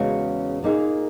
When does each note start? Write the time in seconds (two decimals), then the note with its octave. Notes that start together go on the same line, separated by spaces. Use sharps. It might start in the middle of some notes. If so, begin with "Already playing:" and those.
Already playing: E2 C#3 G#3 C#4 F#4
0.63 A#2 A#3 D#4 G#4